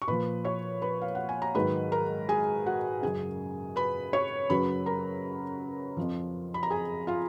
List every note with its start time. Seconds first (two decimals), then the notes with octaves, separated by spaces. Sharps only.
0.02 C#6
0.08 A#2 F3 B4 B5
0.45 C#5 C#6
0.82 B4 B5
1.02 F5
1.15 F#5
1.29 G#5
1.42 A#5
1.55 G#2 D#3 F#3 B4 B5
1.92 A#4 A#5
2.29 G#4 G#5
2.66 F#4 F#5
3.02 F#2 C#3 F#3 G#4 G#5
3.76 B4 B5
4.13 C#5 C#6
4.50 F#2 C#3 F#3 B4 B5
4.86 A#4 A#5
5.97 F2 F3
6.54 B5
6.63 A#5
6.70 G#4 G#5
7.07 F4 F5